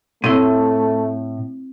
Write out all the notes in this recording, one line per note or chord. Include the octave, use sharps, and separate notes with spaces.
A2 A3 C4 E4